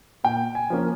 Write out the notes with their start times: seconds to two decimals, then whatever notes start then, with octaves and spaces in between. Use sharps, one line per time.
0.24 A#2 G5
0.55 G#5
0.70 F3 A#3 C#4